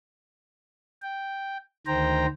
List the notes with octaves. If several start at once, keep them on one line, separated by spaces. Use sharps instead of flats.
G5
D2 D#3 C5 G5 A#5